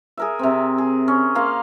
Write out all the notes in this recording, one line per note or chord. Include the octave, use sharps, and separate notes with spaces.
G#4 A#4 E5
C3 C4
G#4
C#4
A#3 F5 C6